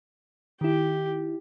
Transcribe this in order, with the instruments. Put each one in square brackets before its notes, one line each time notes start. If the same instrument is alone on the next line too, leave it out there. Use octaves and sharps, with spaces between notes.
[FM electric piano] D#3 E4 [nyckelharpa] G4